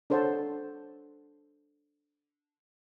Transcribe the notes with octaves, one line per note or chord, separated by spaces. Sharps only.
D4 A4 C5 C#5 F#5 A5